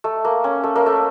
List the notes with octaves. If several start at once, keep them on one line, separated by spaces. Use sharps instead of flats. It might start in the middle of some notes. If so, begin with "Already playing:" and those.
A3
A#3
C#4
A3
A#3
A3